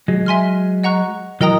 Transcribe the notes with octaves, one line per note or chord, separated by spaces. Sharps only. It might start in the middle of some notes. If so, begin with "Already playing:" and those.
F#3 G#3
E5 G#5 C6 F6
D#5 F#5 A#5 C#6 F#6
E3 F#3 A#4 D#5 G5 A#5 D#6